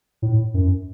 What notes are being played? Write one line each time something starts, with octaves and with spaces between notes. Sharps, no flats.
A2
F#2